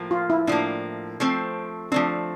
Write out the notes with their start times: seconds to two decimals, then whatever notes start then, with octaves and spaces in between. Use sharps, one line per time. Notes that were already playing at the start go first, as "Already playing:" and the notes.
Already playing: A2 F3 A#3
0.11 F4
0.30 E4
0.47 A2 F3 A#3 D4
1.20 F3 A3 C4
1.92 F3 A3 C4 D4